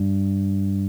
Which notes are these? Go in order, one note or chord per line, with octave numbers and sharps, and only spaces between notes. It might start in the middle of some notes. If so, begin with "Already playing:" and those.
Already playing: G2